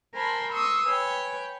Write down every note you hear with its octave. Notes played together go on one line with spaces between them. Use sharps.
A#4 C5 G#5 A5 B5 C6
C6 C#6 D#6 E6
B4 C#5 G5 G#5